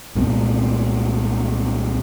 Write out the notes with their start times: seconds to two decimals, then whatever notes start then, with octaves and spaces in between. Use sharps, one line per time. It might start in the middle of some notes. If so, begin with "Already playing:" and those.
0.15 C2 A#2 G#3 B3